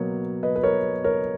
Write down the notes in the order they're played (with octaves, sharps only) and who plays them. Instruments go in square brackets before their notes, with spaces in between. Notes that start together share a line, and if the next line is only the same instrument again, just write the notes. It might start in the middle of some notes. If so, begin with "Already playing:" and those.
Already playing: [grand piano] B2 F#3 A#3 C#5
B4 D#5
B4
A#4 C#5
A#4 C#5